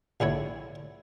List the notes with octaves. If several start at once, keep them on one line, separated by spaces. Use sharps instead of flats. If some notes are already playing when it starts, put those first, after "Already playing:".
A#1 D3 E4 C#5